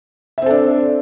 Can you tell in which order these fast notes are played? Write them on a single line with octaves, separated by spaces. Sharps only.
E5 C4 A4 D4